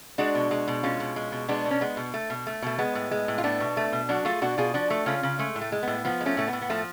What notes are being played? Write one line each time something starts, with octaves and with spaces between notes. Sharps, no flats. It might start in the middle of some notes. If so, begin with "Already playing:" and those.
G#3 D4 F#4
B2
G#3
B2
G#3 C#4 F4
B2
G#3
B2
G#3 B3 D4
B2
C#4
G#3 B3
B2
A3
B2
A3
B2 A3
G#3 B3
A2
G#3
A2
F4
A3 B3 D4
B2
A3
B2
F#3 D4 F#4
A3 F4 G#4
B2 D4 F#4
B2 F4 G#4
F3 D4 F#4
A3
C#3 C#4 F4
C#3
G#3 A3
A2
A3
G#3
A2 B3
F3 B3
G#3
A3 C#4
A2 A3
B3
A2
B3
F3 A3